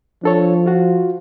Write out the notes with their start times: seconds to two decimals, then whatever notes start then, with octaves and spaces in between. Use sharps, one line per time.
0.24 F3 D4 A4 C#5
0.66 F4 F#4